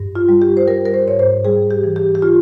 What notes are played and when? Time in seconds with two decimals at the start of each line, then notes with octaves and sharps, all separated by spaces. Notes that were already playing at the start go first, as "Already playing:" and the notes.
Already playing: G2
0.15 F4
0.29 G3
0.42 G4
0.57 C5
0.67 G3 A#4
0.85 A#4
0.94 C5
1.06 G#2 C#5
1.19 C5
1.45 G3 G#4
1.71 G4
1.84 E3
1.96 G4
2.15 G4
2.22 F4